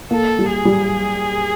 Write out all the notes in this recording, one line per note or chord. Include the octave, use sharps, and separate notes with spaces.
A#3 A4
G3
G#4
G3